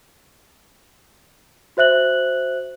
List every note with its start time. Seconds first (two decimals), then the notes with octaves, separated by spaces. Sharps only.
1.77 F#4 C5 E5 F#6 F#7